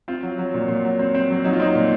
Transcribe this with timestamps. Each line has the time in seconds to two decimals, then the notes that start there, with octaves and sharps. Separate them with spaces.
0.08 C4 F4
0.23 F#3
0.38 F#3
0.54 A#2
0.68 A#2
0.85 F#3
0.99 C4
1.15 C4
1.30 F#3
1.44 F#3 D#4
1.53 F4
1.59 C4 D#4
1.75 A#2